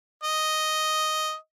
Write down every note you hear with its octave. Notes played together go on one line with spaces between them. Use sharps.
D#5